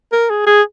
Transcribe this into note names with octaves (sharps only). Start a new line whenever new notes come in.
A#4
G#4
G#4